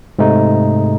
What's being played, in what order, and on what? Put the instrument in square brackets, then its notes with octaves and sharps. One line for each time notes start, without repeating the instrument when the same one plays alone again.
[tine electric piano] G#2 C3 A3 D#4